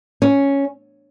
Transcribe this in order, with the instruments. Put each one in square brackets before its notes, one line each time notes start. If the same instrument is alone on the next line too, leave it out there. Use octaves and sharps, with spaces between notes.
[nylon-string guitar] C#4